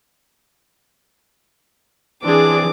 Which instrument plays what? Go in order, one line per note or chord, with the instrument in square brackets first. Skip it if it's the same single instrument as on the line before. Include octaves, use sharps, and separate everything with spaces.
[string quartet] E3 D6 [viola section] C4 D4 G#4